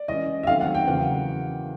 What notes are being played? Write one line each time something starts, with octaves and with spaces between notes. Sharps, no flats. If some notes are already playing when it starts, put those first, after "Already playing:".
Already playing: D5
E3 G#3 C#4 D#5
E5
D#3 F#3 A3 C4 F5
F#5
G5
E2 C#3 F#3 A#3 F#5